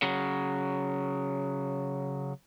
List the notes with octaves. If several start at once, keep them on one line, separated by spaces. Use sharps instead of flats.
C#3 F#3